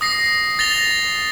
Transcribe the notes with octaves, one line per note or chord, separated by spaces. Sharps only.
D#6 A#6 C7
A6 A#6 F7 G7